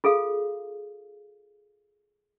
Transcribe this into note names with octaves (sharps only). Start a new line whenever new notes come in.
F4 G#4 A4 F5